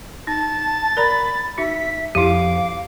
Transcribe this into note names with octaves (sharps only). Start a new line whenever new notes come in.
D#4 A5 A6
A#4 D5 A#5 B5
D#4 F#4 E5 B6
F2 E4 G4 F5 D6